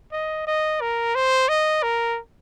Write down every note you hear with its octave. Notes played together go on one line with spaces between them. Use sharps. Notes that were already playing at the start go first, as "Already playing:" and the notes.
D#5
D#5
A#4
C5
D#5
A#4